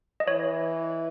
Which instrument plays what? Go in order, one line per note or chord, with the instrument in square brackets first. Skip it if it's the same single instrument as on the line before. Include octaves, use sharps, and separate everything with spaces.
[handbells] D#5
[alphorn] E3 [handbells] C#5